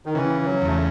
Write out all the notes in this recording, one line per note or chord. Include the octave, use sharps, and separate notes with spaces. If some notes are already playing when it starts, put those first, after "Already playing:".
D#3
C#3 E3
E3
F#3
E2
A3